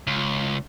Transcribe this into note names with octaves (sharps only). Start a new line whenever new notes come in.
C#2